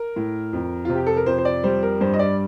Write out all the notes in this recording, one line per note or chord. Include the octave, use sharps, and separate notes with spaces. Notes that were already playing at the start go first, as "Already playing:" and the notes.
Already playing: A#4
A2
F2
C3 F4
G4
A4
A#4
F2 C5
C5
D5
G3 C5
A#4
G2 C5
D#5
D5